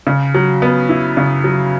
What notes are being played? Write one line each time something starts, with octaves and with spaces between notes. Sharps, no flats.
C#3
F#3
B3
E4
C#3
F#3